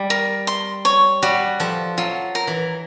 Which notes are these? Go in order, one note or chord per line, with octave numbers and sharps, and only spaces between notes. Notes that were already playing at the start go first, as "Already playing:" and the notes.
Already playing: G3
A#4
C6
C#5
G3 F#4
F3 A4
F#3 F4
A#4
E3